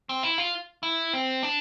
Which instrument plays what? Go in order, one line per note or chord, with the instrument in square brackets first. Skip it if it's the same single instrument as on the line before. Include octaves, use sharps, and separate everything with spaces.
[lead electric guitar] C4
E4
F4
E4
C4
D4